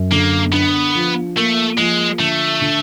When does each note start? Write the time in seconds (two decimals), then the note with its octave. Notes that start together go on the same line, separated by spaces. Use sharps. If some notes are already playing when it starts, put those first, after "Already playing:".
Already playing: F#2
0.11 D3 A#3
0.52 B3 D4
0.95 F3
1.36 A3 A#3
1.78 F3 G#3
2.19 D3 A3
2.62 D3